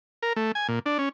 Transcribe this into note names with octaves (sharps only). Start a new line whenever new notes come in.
A#4
A3
G#5
A#2
D4
C#4